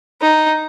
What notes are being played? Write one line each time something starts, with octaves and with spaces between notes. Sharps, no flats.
D#4